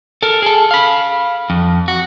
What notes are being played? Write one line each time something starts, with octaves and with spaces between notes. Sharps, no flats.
A4 A#4
G#4 A4
F5 B5
F2
F#4